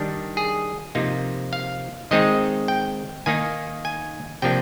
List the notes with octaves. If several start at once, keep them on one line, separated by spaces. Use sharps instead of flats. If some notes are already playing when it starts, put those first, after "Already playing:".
Already playing: D#3 G3 D4
G#4
C3 F3 A#3 D#4
F5
D#3 G#3 C4 D#4 D#5
G5
D#3 A#3 D#4 G#5
G#5
C3 F3 A#3 D4 G5